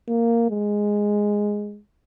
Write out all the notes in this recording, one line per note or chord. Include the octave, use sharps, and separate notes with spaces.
A#3
G#3